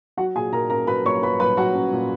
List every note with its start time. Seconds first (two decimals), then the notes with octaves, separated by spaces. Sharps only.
0.17 F#3 F#4 F#5
0.35 A#2 G#4 G#5
0.52 A#2 A#4 A#5
0.70 C#4 A#4 A#5
0.87 F#3 B4 B5
1.05 A#2 C#5 C#6
1.23 A#2 B4 B5
1.40 A#2 B4 B5
1.57 F#3 F#4 F#5
1.75 C#4
1.93 A#2